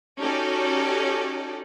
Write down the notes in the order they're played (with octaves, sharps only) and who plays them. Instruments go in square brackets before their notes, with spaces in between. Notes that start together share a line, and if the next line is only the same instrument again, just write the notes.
[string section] C#4 D#4 F#4 G4 A4 D5